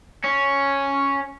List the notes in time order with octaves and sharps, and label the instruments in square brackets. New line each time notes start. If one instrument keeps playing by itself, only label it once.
[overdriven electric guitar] C#4